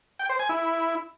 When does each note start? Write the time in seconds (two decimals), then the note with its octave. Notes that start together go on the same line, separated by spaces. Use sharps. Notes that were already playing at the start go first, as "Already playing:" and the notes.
0.19 G5
0.29 C5
0.39 G#5
0.49 E4